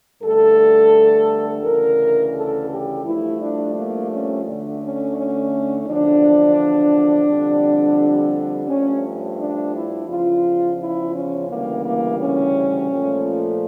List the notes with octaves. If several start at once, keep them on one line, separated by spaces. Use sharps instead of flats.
G2 D3 A3 A4
D2 C#3 E3 A#4
A4
G4
G2 F3 A3 E4
D4
A#3
C#4
D2 D3 A3
C#4
C#4
E2 D3 F3 D4
F2 D3 G3
G2 F3 A3 C#4
D4
E4
E2 C#3 F3 F4
E4
C#4
D2 C#3 E3 G3 A#3
A#3
C#4
A#2 F3 A3